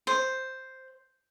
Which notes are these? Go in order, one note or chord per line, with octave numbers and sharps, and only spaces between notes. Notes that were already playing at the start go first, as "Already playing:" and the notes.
C5